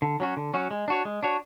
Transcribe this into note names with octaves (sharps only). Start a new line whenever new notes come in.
D3
F#3 C#4 F#4
D3
F#3 C#4 F#4
G#3
D4 F#4 C#5
G#3
D4 F#4 C#5